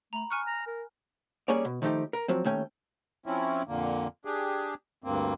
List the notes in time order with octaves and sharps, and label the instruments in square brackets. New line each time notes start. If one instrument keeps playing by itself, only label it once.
[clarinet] A3 [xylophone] A#5 B5
[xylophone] G#5 F6 F#6 [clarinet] C#6
[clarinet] A#5
A#4
[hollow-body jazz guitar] G3 A#3 C#4 G#4 C#5 D5
B2
D#3 F3 A3 D#4 G4
A#4
F3 F#3 C4
D#2 A3 C#4 G5
[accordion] F3 C4 C#4 E4
F2 A#2 D3 A#3
D4 G4 G#4
D2 G2 A#3 C4